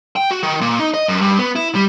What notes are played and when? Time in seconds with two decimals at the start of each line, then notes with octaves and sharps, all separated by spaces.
0.16 G5
0.31 F#4
0.43 D#3
0.61 A#2
0.79 D#4
0.94 D#5
1.08 F#2
1.21 G2
1.39 B3
1.56 E4
1.75 G3